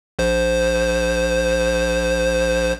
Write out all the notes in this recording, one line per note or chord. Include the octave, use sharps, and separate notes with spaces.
A#1 C5